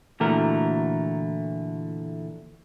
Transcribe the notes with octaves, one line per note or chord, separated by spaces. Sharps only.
A#2 D3 E3 A3 F#4 A#4